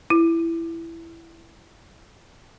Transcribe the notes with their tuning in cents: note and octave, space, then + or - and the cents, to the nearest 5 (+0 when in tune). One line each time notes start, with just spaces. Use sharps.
E4 +10